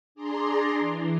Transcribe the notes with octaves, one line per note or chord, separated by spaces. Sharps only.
D4 G#4 D5 A#5 C6
E3